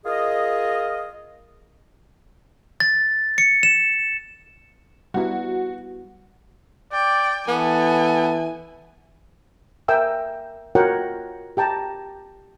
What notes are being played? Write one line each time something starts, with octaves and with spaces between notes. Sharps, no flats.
F4 G#4 A#4 D#5
A6
C#7
E7
G3 B3 E4 F#4
D5 G5
E3 B3 A4 G#5
A#4 E5 G5 G#5 E6
F4 F#4 A#4 C#5 F#5 G5
G4 G5 A5 A#5